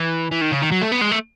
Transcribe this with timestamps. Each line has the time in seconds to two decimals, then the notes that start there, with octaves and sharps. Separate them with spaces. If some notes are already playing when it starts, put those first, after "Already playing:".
Already playing: E3
0.31 E3
0.41 D#3
0.52 C#3
0.62 D#3
0.71 F#3
0.82 A3
0.92 B3
1.01 G#3
1.11 A3